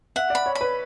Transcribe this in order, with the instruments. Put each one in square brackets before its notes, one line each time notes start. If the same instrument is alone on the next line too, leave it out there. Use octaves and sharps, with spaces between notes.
[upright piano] E5 [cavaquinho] F#5
[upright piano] D5 [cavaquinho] B5
[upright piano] C#5
[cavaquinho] B5
[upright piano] B4